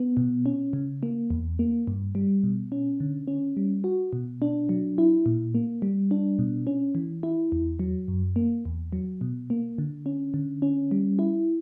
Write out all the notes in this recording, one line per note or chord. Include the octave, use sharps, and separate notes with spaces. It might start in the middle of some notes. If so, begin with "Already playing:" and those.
Already playing: B3
B2
C#4
C#3
A#3
E2
A#3
G2
G3
B2
C#4
D3
C#4
G3
F#4
B2
D4
F#3
E4
A#2
A#3
G3
D4
B2
C#4
E3
E4
E2
F#3
F#2
A#3
E2
F#3
B2
A#3
D3
C#4
D3
C#4
G3
E4